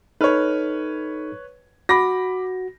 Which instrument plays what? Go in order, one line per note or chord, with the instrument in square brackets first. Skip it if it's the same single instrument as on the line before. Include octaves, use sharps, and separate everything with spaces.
[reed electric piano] D#4 A4 F6 [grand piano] B4 C#5
[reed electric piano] F#4 [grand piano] B5 D6 A#6